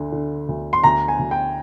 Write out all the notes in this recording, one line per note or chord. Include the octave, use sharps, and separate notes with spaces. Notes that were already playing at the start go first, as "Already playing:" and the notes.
Already playing: D2 D3
D3
D2
C6
D2 A#5
G#5
D2
G5